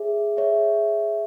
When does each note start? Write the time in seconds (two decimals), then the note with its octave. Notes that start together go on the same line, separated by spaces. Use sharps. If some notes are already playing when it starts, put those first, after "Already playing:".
Already playing: G#4 C#5 E5
0.37 G#4 C#5 E5